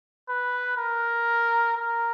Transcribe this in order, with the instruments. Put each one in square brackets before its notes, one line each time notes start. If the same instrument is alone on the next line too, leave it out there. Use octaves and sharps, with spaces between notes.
[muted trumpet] B4
A#4
A#4